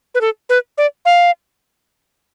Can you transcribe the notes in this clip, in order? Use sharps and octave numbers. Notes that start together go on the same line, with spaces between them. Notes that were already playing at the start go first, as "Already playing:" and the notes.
B4
A4
B4
D5
F5